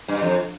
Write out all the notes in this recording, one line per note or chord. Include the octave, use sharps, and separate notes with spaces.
G2
F2